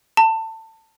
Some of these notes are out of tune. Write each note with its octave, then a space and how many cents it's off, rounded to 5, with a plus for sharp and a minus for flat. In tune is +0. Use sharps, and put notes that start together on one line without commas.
A5 +25